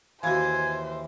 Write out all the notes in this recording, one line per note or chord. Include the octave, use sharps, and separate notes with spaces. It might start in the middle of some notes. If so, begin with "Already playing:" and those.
D#2 E3 F#4 C5 F5 G#5